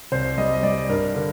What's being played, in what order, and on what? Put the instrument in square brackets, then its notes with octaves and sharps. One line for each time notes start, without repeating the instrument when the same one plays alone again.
[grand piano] C2 C5
G3 D#5
D#5
G3 D5
G2 A#4
D3